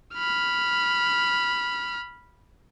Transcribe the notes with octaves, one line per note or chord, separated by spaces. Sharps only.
B5 F6